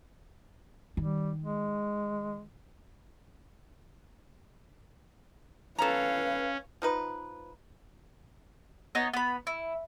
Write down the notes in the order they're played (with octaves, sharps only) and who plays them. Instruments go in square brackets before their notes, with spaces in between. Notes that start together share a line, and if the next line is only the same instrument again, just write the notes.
[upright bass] D#3 [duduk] G3
[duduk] G#3
[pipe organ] C#4 [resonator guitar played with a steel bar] A4 A#5 [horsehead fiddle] B4 F5
[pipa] F3 D#4 B4
[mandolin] B3 D#4 C#5 D#5
B3 B5
E4